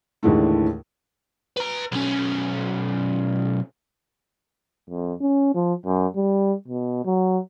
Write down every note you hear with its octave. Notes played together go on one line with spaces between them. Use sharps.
D#2 A2 D3 E3 G#3 A3
B4 A#5
B1 C#4
F2
C#4
F3
F#2
G3
B2
F#3